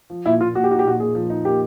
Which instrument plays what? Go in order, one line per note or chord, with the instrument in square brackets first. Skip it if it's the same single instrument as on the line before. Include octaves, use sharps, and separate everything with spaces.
[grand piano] F3
[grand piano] A#2 [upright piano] E4
[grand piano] A#2 [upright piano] F4
[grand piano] A#2 [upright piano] F#4
[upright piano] G4
[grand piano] D#4 [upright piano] F#4
[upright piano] G4
[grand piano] A#2 [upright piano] F#4
[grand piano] A#2 [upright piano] G#4
[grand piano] F3
D#4
[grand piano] A#3 [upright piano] G4